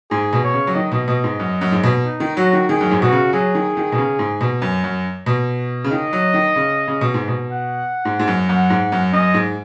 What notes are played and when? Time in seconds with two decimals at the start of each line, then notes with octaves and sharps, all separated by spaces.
0.11 G#2 G#4
0.33 B2
0.44 C#5
0.54 C#3
0.67 F#3
0.75 D#3 D#5
0.92 B2
1.08 B2 D#5
1.24 G#2
1.39 F#2
1.61 F#2
1.72 G#2
1.84 B2
2.04 D#4
2.20 D#3
2.37 F#3 F#4
2.53 D#3
2.69 D#3 G#4
2.81 F#2
2.91 G#2
3.01 B2 F#4
3.12 C#3
3.33 F#3 G#4
3.55 D#3
3.77 D#3
3.92 B2
3.98 C#3
4.19 G#2
4.41 B2
4.62 F#2
4.84 F#2
5.26 B2
5.84 C#3
5.91 D#3 D#5
6.13 F#3
6.34 D#3
6.56 C#3
6.88 C#3
7.01 B2
7.14 G#2
7.28 B2
7.52 F#5
8.05 G#2
8.19 G#2
8.27 F#2
8.49 F#2 F#5
8.70 G#2
8.92 F#2
9.13 F#2 D#5
9.34 G#2